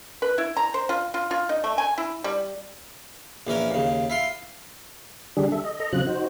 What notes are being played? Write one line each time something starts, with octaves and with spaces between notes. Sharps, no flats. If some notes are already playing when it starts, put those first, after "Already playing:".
B4
E4
A#5
C5
F4
F4
F4
D#4
A3
G#5
E4
G3
A#1 E3 C#4 A#4
D#2 C#3
E4 F4 C6
D3 G3 D4 G4 G#4
A4 E5
D#5
A4 D#5 A#5
C#3 F#3 C4 F4 F#6
D#4 F#4 C5